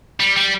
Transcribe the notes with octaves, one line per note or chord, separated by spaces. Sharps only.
G3
G3